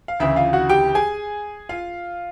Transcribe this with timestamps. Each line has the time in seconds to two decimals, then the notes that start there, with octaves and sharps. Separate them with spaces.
0.08 F5
0.20 D2 C#3 E3 E4 E5
0.36 F4 F5
0.53 F#4 F#5
0.69 G4 G5
0.95 G#4 G#5
1.69 F4 F5